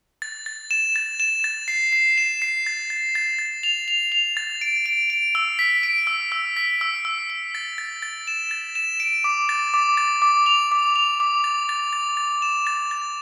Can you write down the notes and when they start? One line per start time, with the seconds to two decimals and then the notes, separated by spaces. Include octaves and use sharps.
0.22 A6
0.46 A6
0.71 E7
0.96 A6
1.20 E7
1.44 A6
1.68 C7
1.92 C7
2.18 E7
2.42 C7
2.67 A6
2.90 A6
3.15 A6
3.39 A6
3.63 F7
3.88 F7
4.12 F7
4.37 A6
4.61 D7
4.86 D7
5.10 D7
5.35 E6
5.59 B6
5.83 D7
6.07 E6
6.32 E6
6.57 B6
6.81 E6
7.05 E6
7.30 E6
7.55 A6
7.78 A6
8.02 A6
8.27 E7
8.51 A6
8.75 E7
9.00 D7
9.24 D6
9.49 A6
9.74 D6
9.97 A6
10.22 D6
10.46 F7
10.72 D6
10.96 F7
11.20 D6
11.44 A6
11.69 A6
11.93 A6
12.17 A6
12.42 E7
12.67 A6
12.91 A6